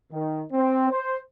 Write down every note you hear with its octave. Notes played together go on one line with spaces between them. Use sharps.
D#3
C4
C5